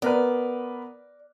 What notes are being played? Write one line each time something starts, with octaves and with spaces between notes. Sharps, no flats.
B3 A#4 B4 D5